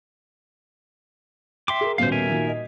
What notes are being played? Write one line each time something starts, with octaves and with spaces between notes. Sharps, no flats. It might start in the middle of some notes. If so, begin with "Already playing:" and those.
E5 G5 C6 D6
G#4 A#4
D#1 B2 C#4 C5 F5
A#4 E5 G#5
A#2 D#3 F#4
D#5